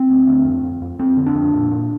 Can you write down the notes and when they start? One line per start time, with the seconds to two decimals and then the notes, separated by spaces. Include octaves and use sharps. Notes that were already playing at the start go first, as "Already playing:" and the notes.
Already playing: C4
0.09 D2
0.27 D2
0.45 F2
0.64 F2
0.82 F2
0.99 F2 C4
1.17 D3
1.26 D4
1.35 F2
1.54 A#2
1.71 A#2